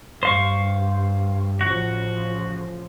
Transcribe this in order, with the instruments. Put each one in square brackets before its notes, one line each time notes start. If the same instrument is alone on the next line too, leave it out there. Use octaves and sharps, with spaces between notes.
[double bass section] G2 [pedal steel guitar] C5 F5 C#6
[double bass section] A1 C#3 F3 [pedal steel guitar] F#4